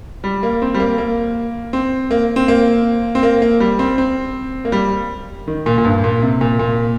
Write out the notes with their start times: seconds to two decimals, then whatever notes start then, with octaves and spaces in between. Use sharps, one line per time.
0.24 G3
0.43 A#3
0.62 C4
0.74 G3
0.80 A#3
0.98 A#3
1.73 C4
2.11 A#3
2.36 C4
2.48 A#3
3.15 C4
3.23 A#3
3.42 A#3
3.60 G3
3.79 C4
3.98 C4
4.65 A#3
4.72 G3
5.48 D#3
5.66 A#2
5.78 A#2
5.85 G2
6.04 A#2
6.22 C3
6.41 A#2
6.59 A#2